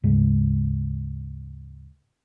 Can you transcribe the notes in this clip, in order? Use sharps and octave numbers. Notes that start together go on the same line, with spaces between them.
D2 G#2 C#3 G#3